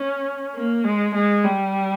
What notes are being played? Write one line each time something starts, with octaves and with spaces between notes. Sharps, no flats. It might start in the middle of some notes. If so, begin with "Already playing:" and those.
Already playing: C#4
A#3
G#3
G#3
G3